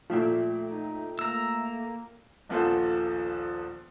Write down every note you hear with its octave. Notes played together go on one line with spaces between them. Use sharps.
A#2 F3 A3 E5 G5
D#4
A#3 A#5 E6
D#1 A#1 B3 F4 A4 C5